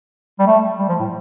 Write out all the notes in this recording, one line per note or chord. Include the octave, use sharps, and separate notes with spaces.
G3
A3
G3
F3
A2